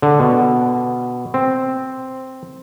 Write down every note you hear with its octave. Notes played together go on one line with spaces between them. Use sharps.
D3
B2
C4